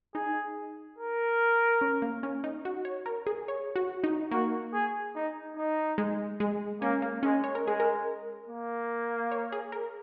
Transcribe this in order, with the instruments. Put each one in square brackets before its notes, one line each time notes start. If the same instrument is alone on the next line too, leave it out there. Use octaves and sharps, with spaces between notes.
[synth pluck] D#4 [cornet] G#4
[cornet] A#4
[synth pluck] C#4
A#3
C#4
D#4
F#4
C#5
A#4
G#4
C#5
F#4
D#4
[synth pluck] A#3 [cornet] F#4
[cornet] G#4
D#4
D#4
[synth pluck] G#3
G#3
[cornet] A#3 [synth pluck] C#4
[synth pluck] A#3
[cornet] G#3 [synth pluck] C#4
[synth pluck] C#5
A#4
[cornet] G#3 [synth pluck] G#4
[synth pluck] A#4
[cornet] A#3
[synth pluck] C#5
G#4
A#4